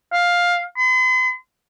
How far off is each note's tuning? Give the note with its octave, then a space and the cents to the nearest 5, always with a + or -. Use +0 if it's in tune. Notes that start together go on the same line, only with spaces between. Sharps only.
F5 +10
C6 -45